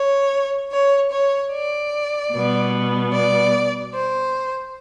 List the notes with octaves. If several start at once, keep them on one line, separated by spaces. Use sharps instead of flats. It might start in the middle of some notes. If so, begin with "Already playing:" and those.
Already playing: C#5
C#5
C#5
D5
B2 G3 B3
D5
C5